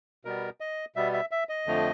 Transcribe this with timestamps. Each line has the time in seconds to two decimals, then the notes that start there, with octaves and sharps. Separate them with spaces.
0.25 B2 G3 B3 A#4
0.61 D#5
0.96 B2 G3 B3 E5
1.13 E5
1.31 E5
1.49 D#5
1.66 F2 D3 F3 A3